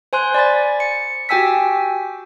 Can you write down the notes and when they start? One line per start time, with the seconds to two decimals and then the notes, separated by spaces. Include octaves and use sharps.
0.13 C5 G#5 C6 F#6
0.34 D5 G#5 B5 A6
0.80 C#7
1.29 F#4 G4 G5 G#5 E6 B6